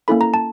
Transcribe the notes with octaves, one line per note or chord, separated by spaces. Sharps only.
A#3 C#4 E4 A4 B5
A#5
A5